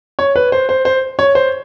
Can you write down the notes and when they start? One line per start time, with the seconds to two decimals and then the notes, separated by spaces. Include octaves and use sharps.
0.19 C#5
0.36 B4
0.52 C5
0.69 C5
0.85 C5
1.19 C#5
1.35 C5